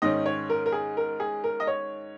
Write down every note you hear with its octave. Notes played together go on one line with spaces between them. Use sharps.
G#2 D#3 C#4 D#5
C#5
A#4
A#4
G#4
A#4
G#4
A#4
D#5
C#5